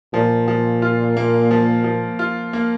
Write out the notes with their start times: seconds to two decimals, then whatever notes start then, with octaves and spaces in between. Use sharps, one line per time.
0.13 A#2 F3
0.48 F3
0.82 F4
1.17 A#3
1.51 F3
1.84 F3
2.19 F4
2.53 A#3